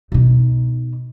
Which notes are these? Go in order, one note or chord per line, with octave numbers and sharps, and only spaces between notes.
B2 D#4